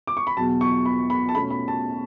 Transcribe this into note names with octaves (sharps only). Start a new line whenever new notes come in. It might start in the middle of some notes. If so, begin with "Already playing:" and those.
D6
C#6
B5
E2 B2 F#3 A5
C#6
B5
B5
A5
B2 A3 C#4 B5
B5
A5